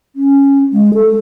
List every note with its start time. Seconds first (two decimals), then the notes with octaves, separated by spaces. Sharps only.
0.16 C#4
0.73 G#3
0.94 A4